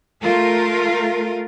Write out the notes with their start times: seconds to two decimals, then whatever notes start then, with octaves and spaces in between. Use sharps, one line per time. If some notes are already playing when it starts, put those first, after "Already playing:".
0.22 A3 F4 A#4